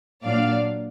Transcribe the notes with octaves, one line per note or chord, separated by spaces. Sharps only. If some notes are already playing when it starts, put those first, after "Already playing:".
A#2 F#3 D4 D5 F5